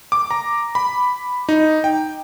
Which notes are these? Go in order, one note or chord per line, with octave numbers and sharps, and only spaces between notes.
D6
A#5
B5
D#4
G5